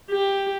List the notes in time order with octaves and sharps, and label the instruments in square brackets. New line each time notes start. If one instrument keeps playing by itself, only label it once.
[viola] G4